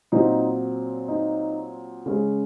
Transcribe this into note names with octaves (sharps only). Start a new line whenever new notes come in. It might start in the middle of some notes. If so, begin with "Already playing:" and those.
A#2 F#3 C4 D#4
D#4
C#3 G#3 C#4